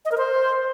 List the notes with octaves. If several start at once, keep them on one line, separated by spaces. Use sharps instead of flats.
D#5
A#4
C5